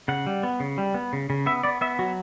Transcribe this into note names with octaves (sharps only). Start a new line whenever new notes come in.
C#3 F#5
G3
B3
C#3
G3
B3
C#3
C#3
B3 E5
B3 D5
B3 E5
F#3 F#4